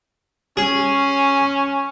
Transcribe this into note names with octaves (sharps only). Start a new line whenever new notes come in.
C#4 G#4